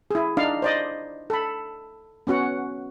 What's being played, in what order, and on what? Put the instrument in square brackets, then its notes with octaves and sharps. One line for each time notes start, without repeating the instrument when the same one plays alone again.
[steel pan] E4 G#4
D4 D#4 D5 F5
C5 D5 D#5
A4 B5
B3 C#4 F#4 F#5